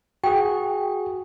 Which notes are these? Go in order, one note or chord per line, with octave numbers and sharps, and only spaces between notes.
F#4 G#4 G5